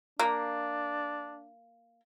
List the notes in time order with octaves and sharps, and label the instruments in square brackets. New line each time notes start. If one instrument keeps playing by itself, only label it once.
[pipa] A#3 [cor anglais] D4